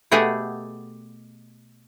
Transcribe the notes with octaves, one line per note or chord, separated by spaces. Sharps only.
B2 A3 G4 G#4 F#5 G#5